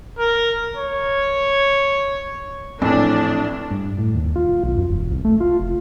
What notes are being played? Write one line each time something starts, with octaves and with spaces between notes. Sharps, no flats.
A#4
C#5
A#1 A2 E3 C4 D4
G2
A2
D#2
F4
B1
F#2
E1
C2
A3
F4
F1